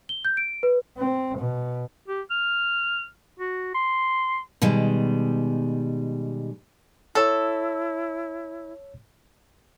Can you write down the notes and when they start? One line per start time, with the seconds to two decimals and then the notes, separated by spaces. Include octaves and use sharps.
0.09 G7
0.25 G6
0.37 D7
0.63 B4
0.97 C4
1.38 B2
2.08 G4
2.31 F6
3.39 F#4
3.74 C6
4.62 B2 D#3 G3 G#3
7.15 E4 A4 C#5 E6